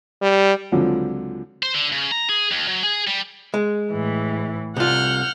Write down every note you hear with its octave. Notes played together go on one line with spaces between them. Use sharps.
G3
C#2 D3 F3 F#3 C4
C5
D3
C#3
A#5
G#4
D#2
F#3
G#4
G3
G#3
A2 E3
C2 F4 F#5 F6 G6